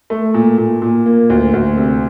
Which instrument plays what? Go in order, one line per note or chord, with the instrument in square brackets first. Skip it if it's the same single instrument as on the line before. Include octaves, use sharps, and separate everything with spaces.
[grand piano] A3
A#2
A#2
A#2
A#3
D2
D2
C3